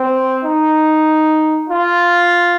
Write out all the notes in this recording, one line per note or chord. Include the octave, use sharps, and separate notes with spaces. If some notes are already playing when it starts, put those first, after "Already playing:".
Already playing: C4
D#4
F4